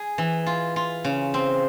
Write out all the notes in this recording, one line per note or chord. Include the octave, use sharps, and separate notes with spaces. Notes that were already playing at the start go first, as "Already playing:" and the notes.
Already playing: G#4
E3
F4
F4
C#3
C4